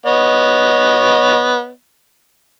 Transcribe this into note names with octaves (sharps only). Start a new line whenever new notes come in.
B3 C#5 D#5